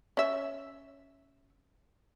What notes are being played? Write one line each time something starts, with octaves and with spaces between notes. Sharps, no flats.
C#4 E5